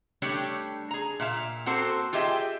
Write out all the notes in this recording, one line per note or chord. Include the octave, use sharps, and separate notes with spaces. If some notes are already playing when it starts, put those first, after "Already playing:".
G3 A3 D4 G4 C#5
G#4 A#5
A#2 E5 F5
A#3 C4 F#4 A4 C5
F4 G4 G#4 D#5 E5 G5